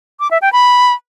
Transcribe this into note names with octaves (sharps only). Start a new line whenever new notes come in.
D6
E5
G5
B5